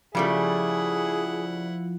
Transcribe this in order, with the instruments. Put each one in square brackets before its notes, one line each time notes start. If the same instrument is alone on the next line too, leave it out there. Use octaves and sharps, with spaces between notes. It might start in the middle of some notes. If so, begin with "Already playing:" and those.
[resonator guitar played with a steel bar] C#3 G3 A3 [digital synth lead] F3 [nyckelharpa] E4 F#5 [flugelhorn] G#4